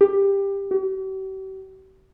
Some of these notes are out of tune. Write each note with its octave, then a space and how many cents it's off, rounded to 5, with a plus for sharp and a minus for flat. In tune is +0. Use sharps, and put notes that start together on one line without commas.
G4 +15
G4 -45